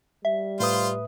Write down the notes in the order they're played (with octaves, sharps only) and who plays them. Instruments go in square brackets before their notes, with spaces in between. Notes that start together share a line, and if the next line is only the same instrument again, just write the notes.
[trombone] G3 [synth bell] E5
[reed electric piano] A2 B4 D#6 [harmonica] F4 C5